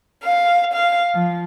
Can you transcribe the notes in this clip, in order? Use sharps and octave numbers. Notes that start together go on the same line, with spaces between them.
F5
F5
F3